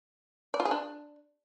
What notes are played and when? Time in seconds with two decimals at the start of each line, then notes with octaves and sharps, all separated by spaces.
0.54 D5
0.60 F4
0.65 G#4
0.71 D4